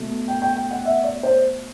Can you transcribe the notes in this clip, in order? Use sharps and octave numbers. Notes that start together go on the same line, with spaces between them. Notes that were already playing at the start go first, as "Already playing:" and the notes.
Already playing: B2 A3
G5
G5
G5
F#5
E5
D5
C5